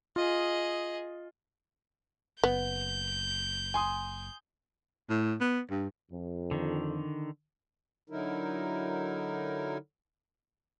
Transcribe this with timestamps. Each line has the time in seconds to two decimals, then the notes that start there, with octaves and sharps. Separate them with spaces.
0.16 F4 G#4 D#5
2.44 F#1 B3 G6
3.74 G#5 C6 D#6
5.10 A2
5.41 B3
5.71 G2
6.11 F2
6.51 D3 D#3
8.10 D3 F#3 D#4 E4 A#4